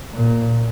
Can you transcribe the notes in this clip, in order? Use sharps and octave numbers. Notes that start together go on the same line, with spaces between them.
A#2